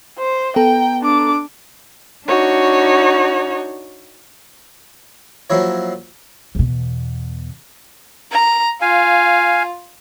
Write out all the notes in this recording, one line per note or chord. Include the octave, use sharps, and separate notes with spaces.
C5
B3 A4 G5 A#5
D4 D6
D4 D#4 F#4 C#5
F3 F#3 A#3 E4 C#5
E2 B2
A#5
F4 F5 G#5